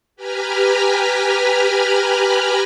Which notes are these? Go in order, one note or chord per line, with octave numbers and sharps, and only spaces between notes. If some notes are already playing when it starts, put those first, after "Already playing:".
G4 B4 G#5 A#5 B5 F6